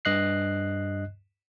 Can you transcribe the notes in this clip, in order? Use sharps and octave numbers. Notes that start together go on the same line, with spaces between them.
G2 D#5 F#6 C7